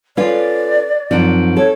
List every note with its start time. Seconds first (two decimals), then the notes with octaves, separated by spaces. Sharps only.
0.17 C#4 F4 A4 B4 D5
1.11 F#2 F3 C4 D#4 D7
1.57 A4 C#5